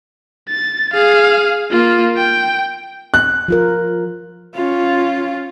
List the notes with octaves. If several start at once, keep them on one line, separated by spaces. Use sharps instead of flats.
A6
G#4 F5
A#3 F4
G5
F#6
F3 F4 A#4
C#4 F4